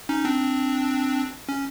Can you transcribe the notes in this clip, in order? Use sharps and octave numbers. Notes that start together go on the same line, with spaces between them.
C#4 D#4
C4 D4
C#4